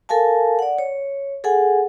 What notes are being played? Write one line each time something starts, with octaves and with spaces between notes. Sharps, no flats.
A4 A#4 F5 G#5 A5
D5 F#5
C#5
G#4 A4 F#5 G#5